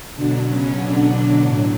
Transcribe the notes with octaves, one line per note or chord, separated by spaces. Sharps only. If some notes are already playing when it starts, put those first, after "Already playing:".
B2 D3 F#3 D4
C#3 C#4
B2 D3 F#3 D4
A2 F#3